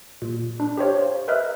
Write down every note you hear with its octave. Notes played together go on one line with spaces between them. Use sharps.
A#2
D4
G4 C5 C#5 F5
C5
A#4 B4 D#5 E5 F6 F#6